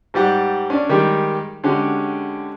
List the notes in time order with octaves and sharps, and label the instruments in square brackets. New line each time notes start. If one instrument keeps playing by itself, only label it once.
[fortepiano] G#2 G3 G4 F#5
C#4 D4 D5
D#3 G3 G#3 G4
D3 G#3 C#4 F#4 G4